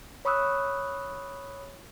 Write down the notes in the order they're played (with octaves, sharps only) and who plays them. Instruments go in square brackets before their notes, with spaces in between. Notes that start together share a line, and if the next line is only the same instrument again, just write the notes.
[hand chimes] C#5 B5 C#6 D#6 E6 F#6